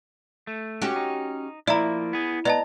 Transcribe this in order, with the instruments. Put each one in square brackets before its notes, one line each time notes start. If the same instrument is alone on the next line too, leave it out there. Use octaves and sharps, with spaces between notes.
[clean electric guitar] A3
[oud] C#4 F#4 G4
[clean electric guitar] D#4
[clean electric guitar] F3 A#3 [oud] E4 [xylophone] D5 A#5
[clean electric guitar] B3 G#4
[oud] B3 [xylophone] D5 D#5 A5 [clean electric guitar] A#5